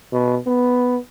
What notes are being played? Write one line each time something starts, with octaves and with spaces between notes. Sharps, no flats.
B2
B3